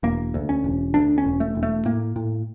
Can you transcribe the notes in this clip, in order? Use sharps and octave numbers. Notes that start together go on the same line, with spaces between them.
E1 A#3
D2
C#4
E1
D2 D4
C#4
E1
A3
E1
A3
A2 A#3
A2